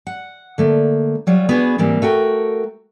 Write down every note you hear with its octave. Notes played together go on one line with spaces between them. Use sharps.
F#5
D3 A3 A#3
F#3 G3 F4
B3 D4 F#4 G#4 B4
G#2 E3 G3 A#3 C4
A3 F#4 A#4 G5